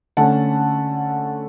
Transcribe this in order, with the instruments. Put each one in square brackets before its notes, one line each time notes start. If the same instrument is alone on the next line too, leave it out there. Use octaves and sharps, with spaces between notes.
[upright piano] D3 A3 C#4 F#5 A5